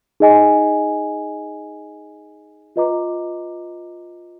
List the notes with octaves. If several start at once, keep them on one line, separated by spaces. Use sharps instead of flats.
D#4 G#4 D#5 G#5
F4 B4 D#5 A#5 D6